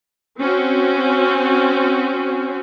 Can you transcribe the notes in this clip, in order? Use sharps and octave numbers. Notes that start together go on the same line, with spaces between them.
C4 C#4 F#4